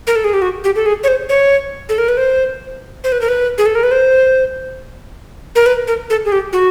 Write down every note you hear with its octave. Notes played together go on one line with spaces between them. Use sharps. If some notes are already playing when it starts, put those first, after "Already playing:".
A#4
A4
G#4
G4
F#4
G4
A4
G#4
C#5
C5
C#5
A4
A#4
B4
C5
C5
B4
A#4
B4
G#4
A4
A#4
B4
C5
A#4
B4
A#4
A4
G#4
G4
F#4